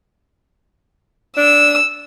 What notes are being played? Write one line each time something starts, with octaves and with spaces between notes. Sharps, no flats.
D4 E6